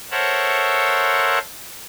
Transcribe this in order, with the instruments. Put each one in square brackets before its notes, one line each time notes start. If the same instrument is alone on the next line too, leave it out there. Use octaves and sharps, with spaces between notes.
[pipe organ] A4 A#4 C5 C#5 E5 F#5